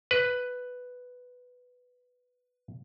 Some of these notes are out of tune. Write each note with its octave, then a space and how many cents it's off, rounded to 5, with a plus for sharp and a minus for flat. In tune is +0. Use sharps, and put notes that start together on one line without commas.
B4 +5